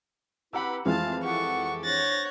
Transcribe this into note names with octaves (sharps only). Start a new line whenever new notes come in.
C4 E4 G4 B4 F#5 A#5 B5 E6
F2 E3 G#3 A3 E4 F4 F5 A5
G4 A4 F#5 C#6
D4 C5 C#5 F#5 A6 A#6